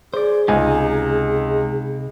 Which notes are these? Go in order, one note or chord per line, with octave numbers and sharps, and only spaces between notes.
G#4 C5 D5
C#2 C3 D#4 G#5